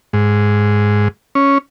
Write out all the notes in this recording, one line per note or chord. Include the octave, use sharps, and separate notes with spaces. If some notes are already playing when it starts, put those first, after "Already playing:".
G#2
C#4